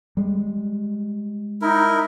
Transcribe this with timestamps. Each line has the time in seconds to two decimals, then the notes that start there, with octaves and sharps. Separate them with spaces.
0.17 G3 G#3
1.62 D#4 E4 A#4